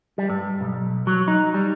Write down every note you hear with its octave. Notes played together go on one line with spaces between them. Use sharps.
G3
G2
B1
F#3
D#4
G3